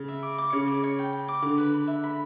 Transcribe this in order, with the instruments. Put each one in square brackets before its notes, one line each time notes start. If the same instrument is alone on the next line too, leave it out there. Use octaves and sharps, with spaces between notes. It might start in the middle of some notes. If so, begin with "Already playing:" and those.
Already playing: [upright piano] C#3
[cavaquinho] E5
D6
D6
[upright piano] C#3 [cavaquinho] C#5
[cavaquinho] D6
C#5
G5
G5
D6
[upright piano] D3 [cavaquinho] D6
[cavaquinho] B4
B4
E5
B5